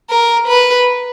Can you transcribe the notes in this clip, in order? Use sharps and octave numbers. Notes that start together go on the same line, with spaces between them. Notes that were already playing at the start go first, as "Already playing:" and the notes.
A#4
B4